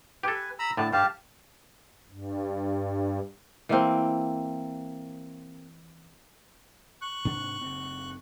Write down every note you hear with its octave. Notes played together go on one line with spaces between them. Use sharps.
G4 A4 B4 G#5
A#5 B5 E6
A2 D3 A5
G2 G4 F5 A5
G2
E3 A#3 C4
C#6 F#6
G#2 C3 D4
F#1 C#3 C4